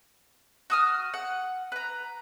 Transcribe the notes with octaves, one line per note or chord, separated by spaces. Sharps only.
F#4 D#6 F6
F#5
B4 A#5